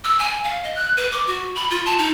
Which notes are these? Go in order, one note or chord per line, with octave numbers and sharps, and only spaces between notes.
E6
G#5
F5
D#5
F#6
B4
D6
F#4
B5
F4
A5
D#4